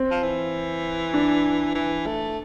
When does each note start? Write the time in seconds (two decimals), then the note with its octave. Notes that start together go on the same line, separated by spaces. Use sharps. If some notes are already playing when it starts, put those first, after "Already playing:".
Already playing: C4
0.11 F3
0.23 E3
1.14 D4
1.75 E3
2.06 A3